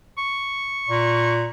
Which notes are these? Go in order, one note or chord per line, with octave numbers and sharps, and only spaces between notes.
C#6
A#2